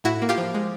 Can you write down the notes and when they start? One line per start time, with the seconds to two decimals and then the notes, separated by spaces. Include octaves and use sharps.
0.04 A2 E4 F#4
0.22 A#3
0.29 F4 G4
0.38 F3
0.54 G#3